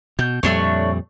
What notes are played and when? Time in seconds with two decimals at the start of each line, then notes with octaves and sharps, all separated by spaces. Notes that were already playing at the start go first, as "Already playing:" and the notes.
0.19 B2 G6
0.43 F2 A#2 G3 A3 D4 C#5